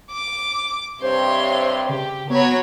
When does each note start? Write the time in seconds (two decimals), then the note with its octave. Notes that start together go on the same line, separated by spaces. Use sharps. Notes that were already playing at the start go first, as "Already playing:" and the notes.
0.12 D6
1.02 G2 C3 C5 C#5 C6
1.89 C#3 G4
2.30 F#3 B3 C#5 B5